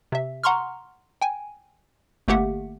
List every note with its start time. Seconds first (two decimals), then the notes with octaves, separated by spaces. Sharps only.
0.12 C3 E5
0.44 F#5 A#5 C6 C#6 F6
1.22 G5 G#5
2.28 G1 A3 A#3 G4 E5 F#5